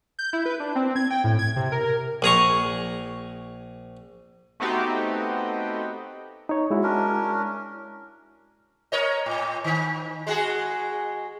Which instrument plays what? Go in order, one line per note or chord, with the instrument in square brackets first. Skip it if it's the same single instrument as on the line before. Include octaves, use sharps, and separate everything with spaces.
[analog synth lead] G6
E4
B4
D4
C4
G#6
G5
A2
G#6
C3
A#4
[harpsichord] A#1 G#4 A#5 C#6
[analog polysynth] A3 B3 C4 D#4 F#4 G4
[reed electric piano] D#4 C#5
G#3 E4 F#4
[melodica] C#4 D4 A#4
[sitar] A#4 C#5 D#5
A2
D#3
G#3 F#4 G#4